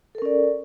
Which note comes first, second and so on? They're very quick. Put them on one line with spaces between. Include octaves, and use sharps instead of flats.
A4 A#4 C#4 D5